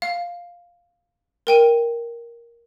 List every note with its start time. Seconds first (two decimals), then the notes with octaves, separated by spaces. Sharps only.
0.02 F5
1.47 A#4 G5 D#7